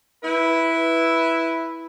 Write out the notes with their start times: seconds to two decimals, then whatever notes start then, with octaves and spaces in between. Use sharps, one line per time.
0.23 E4 B4